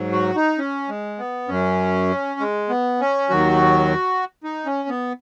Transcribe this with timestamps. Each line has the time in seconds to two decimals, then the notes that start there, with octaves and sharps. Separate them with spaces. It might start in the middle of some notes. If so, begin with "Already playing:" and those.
Already playing: G#2 F#3
0.12 F#4
0.36 D#4
0.58 C#4
0.89 G#3
1.18 B3
1.48 F#2 F#3 C#4
2.40 G#3
2.69 B3
3.01 C#4
3.30 D#2 D#3 F#3 F#4
4.44 D#4
4.66 C#4
4.89 B3